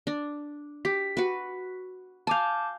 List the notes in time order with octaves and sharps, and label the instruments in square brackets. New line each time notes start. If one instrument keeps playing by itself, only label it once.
[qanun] D4
[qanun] G4 [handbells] B6
[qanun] F#4 B4
[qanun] F5 G#5 [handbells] A5 D6 G6